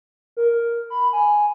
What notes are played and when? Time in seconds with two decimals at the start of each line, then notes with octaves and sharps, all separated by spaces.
0.37 A#4
0.90 B5
1.13 G#5